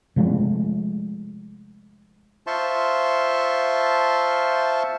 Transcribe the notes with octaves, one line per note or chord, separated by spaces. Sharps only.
C3 F3 G#3 A3
F4 C5 E5 A5 C6 C#6